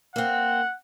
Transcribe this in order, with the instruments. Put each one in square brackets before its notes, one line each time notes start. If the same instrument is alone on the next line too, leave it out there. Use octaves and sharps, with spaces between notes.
[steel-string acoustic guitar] A#3 C4 [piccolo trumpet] F#5